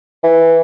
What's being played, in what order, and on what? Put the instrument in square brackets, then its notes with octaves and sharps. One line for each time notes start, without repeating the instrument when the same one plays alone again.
[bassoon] E3